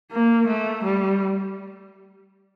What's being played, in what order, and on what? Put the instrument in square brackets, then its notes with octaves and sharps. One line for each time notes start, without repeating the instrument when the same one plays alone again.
[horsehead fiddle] A#3
A3
G3